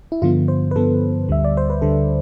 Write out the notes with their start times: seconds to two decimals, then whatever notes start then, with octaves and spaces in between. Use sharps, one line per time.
0.12 E4
0.22 G2 D3 F3 B3 F4
0.48 C5
0.71 B4
0.75 G2 D3 F3 B3 A4
1.29 D2 D3 G3 E5
1.44 D5
1.57 C5
1.70 B4
1.82 D2 D3 G3 A4